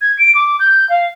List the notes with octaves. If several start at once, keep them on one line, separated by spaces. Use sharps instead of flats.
G#6
D7
D6
G6
F5